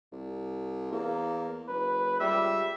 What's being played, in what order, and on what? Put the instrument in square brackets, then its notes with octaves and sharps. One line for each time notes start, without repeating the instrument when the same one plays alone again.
[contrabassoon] C2
[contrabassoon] E2 [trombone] A#3
[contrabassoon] F#1 [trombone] B4
[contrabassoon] C#2 [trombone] G3 [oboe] E5